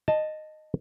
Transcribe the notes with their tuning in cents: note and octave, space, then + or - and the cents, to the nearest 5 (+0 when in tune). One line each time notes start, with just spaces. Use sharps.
D#5 -10 A5 +0